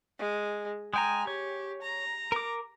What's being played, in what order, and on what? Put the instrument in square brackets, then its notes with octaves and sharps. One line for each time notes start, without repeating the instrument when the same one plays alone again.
[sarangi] G#3
[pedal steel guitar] G#3 G5 A#5 [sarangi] G#5
[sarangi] G4 [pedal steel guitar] C#5
[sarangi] A#5
[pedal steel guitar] A#4 D6